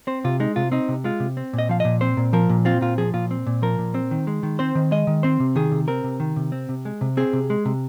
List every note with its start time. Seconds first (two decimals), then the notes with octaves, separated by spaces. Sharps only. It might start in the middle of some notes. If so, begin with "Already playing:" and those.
0.07 C4 C5
0.24 C3 F4
0.40 G#3 D#4
0.56 C3 F4
0.72 C4 D#4
0.89 C3
1.04 G#3 F4
1.20 C3
1.37 C4
1.53 A#2
1.59 D#5
1.69 F3 F5
1.80 A#2 D#5
2.01 C4 C5
2.17 A#2
2.33 F3 A#4
2.49 A#2
2.65 C4 F4
2.81 A#2 F4
2.98 F3 G#4
3.14 A#2 F4
3.31 C4
3.47 A#2
3.62 F3 A#4
3.79 A#2
3.95 C4
4.11 D#3
4.27 G#3
4.43 D#3
4.59 C4 C5
4.75 D#3
4.91 G#3 D#5
5.07 D#3
5.23 C4 C5
5.40 C3
5.56 D#3 G#4
5.71 C3
5.88 C4 A#4
6.04 C3
6.20 D#3
6.36 C3
6.52 C4
6.69 C3
6.85 G#3
7.01 C3
7.17 C4 G#4
7.33 C3
7.50 G#3
7.65 C3